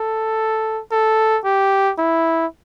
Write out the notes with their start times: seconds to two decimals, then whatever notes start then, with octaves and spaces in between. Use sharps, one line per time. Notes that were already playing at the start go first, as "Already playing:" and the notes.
Already playing: A4
0.91 A4
1.44 G4
1.98 E4